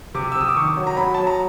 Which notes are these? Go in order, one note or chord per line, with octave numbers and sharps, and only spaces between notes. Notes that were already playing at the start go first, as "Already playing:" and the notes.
C3 D6
E6
C3
D#6
D6
D#3 C#6
F#3
A#5
F#3 B5
F#3 A5
A#5